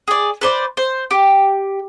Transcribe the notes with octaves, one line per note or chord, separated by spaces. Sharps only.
G#4 D5
B4 C5 D5
C5
G4